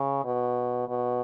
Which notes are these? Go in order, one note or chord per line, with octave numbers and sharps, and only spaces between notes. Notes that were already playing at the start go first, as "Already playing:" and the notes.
Already playing: C#3
B2
B2